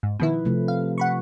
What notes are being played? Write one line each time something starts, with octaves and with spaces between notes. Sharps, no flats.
G#2
B2 D#3 F3 E4 B4
C3 F3 A3
F5
F#5 B5 C#6